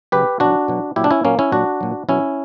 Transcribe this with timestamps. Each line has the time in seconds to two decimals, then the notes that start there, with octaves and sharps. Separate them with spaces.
0.12 C#3 F#3 G4 B4
0.40 B2 F#3 D4 F#4
0.68 B2 F#3
0.96 A#2 F#3 E4 G4
1.04 D4
1.11 C#4 E4
1.24 A#2 F#3 A#3 C#4
1.39 C#4 E4
1.52 A#2 F#3 D4 F#4
1.81 A#2 F#3
2.09 B2 F#3 C#4 E4